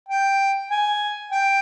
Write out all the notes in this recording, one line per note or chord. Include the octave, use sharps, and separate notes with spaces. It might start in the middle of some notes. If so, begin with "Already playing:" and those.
G5
G#5
G5